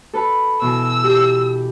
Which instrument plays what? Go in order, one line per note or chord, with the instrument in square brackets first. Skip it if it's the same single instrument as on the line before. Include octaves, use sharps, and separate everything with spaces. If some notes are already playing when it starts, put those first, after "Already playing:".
[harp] A4 B4 B5
[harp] B2 E3 [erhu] E6
[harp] G4